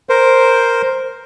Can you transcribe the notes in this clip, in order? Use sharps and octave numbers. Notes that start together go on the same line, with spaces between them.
A#4 C5